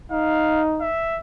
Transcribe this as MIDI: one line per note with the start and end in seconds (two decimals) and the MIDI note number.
0.12 0.90 63
0.12 0.62 77
0.80 1.20 76